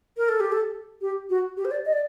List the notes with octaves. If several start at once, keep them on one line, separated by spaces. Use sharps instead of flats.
A#4
A4
G4
A4
G4
F#4
G4
C5
D5
D#5
D5